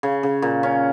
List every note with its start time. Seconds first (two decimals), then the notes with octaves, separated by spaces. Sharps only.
0.03 C#3
0.23 C#3
0.42 A#2
0.63 C#4